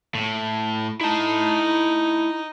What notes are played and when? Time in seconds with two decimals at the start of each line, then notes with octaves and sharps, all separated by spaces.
0.15 A2
1.01 D#4 E4 A5